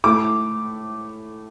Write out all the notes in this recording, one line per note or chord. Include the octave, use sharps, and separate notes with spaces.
A2 A3 D6